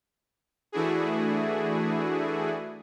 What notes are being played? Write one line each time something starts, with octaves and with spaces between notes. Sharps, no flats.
E3 A3 D4 E4 F#4 G#4